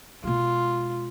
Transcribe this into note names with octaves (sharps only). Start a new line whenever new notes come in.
B2 G#3 F4